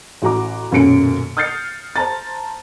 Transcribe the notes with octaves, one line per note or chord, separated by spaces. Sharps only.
A1 F#4 A#5 D6
D#1 F#2 B2 C#4 C#7 D7
D#6 F6 G6 A6 C7 C#7
C5 A5 A#5 A6